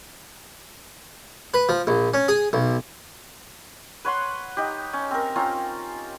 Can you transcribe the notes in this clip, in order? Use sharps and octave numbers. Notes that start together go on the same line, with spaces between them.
B4
F3
A#1
C#4
G#4
B1
B4 C#5 F#5 C6
D#4 G4
C#4
C4 A#4
C4 C#4 F4 A#5